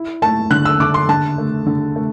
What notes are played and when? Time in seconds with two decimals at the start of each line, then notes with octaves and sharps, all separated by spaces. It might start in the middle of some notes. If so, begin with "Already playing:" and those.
Already playing: E4
0.22 A3 A5
0.51 D3 F#6
0.65 E6
0.80 D3 D6
0.94 C6
1.09 D3 A5
1.38 A3
1.66 D3
1.96 A3